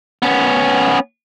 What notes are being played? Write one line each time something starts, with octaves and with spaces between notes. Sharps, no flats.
B3 C#4